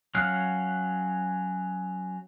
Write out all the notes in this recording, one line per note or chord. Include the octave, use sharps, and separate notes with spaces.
F#3 C#4 F5 F#5 F6